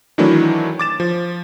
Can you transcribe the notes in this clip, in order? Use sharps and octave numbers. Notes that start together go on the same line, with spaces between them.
D#3 E3 F#3 A3 D4 E4
D6 A6 E7
F3